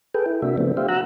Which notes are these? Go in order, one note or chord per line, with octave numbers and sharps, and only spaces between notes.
G#4 A4 B4 G5
E4
C3 A#3 D4 F#4 E5
C#3 F3 A3 B3 C4 D4
G4 C5 E5 F5
F#4 F#5 A#5 E6 F#6